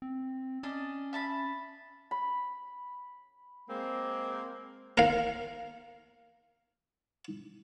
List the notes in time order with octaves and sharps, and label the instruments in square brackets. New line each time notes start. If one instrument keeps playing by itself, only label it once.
[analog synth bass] C4
[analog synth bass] C#4 [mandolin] D4 D#5
[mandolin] E5 A5 B5
[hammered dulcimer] B5
[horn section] G#3 A#3 C4
[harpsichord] A#4 F5